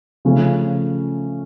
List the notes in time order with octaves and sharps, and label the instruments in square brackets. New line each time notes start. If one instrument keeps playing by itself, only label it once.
[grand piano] C#3 F3 A3 C#4 F4